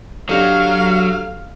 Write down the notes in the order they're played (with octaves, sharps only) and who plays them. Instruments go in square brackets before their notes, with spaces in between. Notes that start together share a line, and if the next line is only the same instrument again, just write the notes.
[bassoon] D3 [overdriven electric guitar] F#3 [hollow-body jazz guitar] D4 G4 D#5 [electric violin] F5